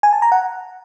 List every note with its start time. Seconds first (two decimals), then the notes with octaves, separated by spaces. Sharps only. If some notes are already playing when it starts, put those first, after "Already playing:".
0.03 G#5
0.13 A5
0.22 A#5
0.32 F#5